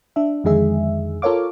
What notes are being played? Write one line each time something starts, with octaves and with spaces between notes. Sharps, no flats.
D4 E5
F2 D3 D#3 G#3 G#4 E5
F4 A4 A#4 C#5 F5 D6